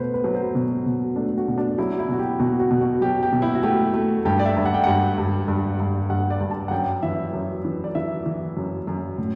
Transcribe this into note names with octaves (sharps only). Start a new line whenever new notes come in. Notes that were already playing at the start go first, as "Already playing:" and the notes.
Already playing: B2 A3 B4 C5
B4
F#3
C5
B2
B2
A3 D4
F#4
B2
D4
F#3 E4
E4
B2 F#4
G4
B2 F#4
F#4
B2
F#4
F#3 G4
G4
B2
E4
F#4
A3 G4
A3
G2 G4
D5
E5
G2
F#5
G5
G2 F#5
G2
G2
G2
G2 F#5
D5
G2
A5
F#5
F#2 G5
E3 E5
F#2
E3
D5
E3 E5
E3
F#2
F#2
A2